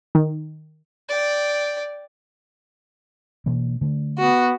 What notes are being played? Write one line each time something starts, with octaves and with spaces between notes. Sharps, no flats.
D#3
D5 G5
B2 E3 A#3
D3 A3
B3 F#4